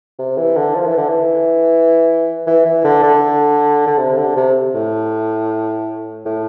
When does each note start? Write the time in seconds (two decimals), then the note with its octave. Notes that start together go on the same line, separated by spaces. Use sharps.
0.18 C3
0.37 E3
0.56 D3
0.76 F3
0.86 E3
0.97 D3
1.08 E3
2.47 E3
2.65 E3
2.84 D3
3.03 D3
3.87 D3
3.98 C3
4.17 D3
4.36 C3
4.74 A2
6.25 A2